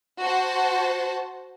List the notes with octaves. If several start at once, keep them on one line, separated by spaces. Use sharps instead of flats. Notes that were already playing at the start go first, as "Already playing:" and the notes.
F#4 C5 A5